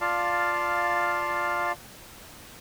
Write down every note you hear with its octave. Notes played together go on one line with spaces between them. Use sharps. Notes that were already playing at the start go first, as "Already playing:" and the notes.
F4 D5 F5 A5